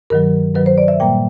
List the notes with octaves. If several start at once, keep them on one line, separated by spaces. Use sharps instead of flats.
G2 D#3 F#3 A#4
G2 D#3 F#3 B4
C5
D5
E5
A#2 G3 A#3 G5